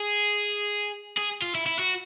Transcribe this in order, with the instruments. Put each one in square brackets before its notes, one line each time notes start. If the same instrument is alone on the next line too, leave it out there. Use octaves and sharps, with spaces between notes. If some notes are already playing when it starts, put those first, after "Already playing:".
Already playing: [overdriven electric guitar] G#4
G#4
F4
E4
E4
F#4